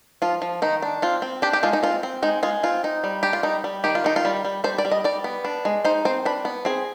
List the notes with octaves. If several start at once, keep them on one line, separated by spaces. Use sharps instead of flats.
F3 F4
F3
D#3 D#4
D4
C4 F4
C4
D4 G4
G4
G#3 F4
D#4
C4 F4
C4
G#3 D#4
G#3 F4
C4 F4
D#4
G3
D4 G4
F4
G3 D#4
G3
D#3 G4
F4
D#3 D#4
F4
G3
G3
G3 C5
D5
G3
D#5
G3 D5
B3
D4
G#3
D#4 C5
C4 C5
D4 B4
B3
C4 G#4